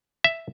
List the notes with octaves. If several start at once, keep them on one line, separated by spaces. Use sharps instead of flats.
E5